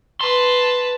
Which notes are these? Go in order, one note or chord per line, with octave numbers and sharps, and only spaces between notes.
B4 A5 C6